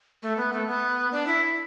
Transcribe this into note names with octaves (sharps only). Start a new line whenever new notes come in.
A3
B3
A3
B3
D4
E4